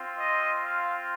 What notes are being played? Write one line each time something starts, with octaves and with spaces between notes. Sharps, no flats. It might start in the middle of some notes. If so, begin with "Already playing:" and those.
Already playing: C4 F4
D#5
F5